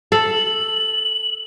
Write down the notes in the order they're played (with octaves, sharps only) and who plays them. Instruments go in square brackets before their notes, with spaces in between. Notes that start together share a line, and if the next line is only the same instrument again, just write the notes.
[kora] A4 [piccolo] F#7